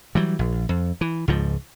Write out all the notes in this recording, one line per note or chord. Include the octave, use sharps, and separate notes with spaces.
E3 F#3 G3
A#1
F2
E3
C#2 G#2 F3